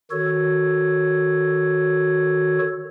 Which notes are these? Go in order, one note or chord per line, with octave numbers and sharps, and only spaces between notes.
D#3 F#4 A4 C#5